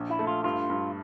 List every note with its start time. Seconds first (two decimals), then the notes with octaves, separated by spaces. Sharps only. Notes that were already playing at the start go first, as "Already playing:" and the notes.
Already playing: A#1
0.10 E4
0.19 A3
0.27 F4
0.44 G2 F4
0.70 G2